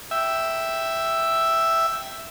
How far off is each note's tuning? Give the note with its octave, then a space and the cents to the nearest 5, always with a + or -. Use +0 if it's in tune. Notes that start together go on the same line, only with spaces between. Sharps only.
E5 +0 G5 -5